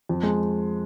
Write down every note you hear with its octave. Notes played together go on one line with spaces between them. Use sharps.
F2
G#3